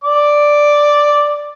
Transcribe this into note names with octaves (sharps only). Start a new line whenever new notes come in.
D5 D6